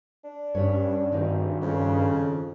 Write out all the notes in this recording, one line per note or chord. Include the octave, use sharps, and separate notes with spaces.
D4
G2 C#4 B4 C#5
G#1 D#3 C4 D#4
F2 C#3